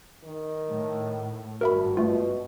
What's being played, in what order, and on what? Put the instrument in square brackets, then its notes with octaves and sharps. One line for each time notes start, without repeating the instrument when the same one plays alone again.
[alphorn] D#3
[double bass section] A2
[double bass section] G#1 G2 [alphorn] F#4 [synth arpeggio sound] A#4 E5 B5
[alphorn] B2 [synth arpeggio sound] A3 F4